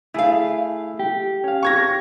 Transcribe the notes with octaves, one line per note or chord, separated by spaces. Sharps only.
A3 E4 G#4 F5
G4
C#4 F5
C#6 G#6 A#6